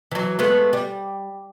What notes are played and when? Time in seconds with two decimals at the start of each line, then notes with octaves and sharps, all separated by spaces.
0.11 E3 F#3
0.39 G#3 A3 B3
0.73 G3